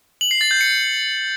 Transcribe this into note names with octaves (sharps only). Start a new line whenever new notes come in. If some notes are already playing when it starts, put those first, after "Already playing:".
F#7
C7
A6
G6
C#7